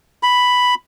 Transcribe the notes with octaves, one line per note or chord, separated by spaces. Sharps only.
B5